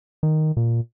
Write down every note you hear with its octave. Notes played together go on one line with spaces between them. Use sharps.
D#3
A#2